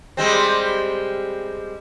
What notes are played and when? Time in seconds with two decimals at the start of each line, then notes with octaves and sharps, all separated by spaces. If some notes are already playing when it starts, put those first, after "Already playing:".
0.17 G3 G#3 C4